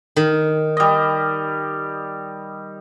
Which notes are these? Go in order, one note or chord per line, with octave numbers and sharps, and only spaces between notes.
D#3
G3 D#5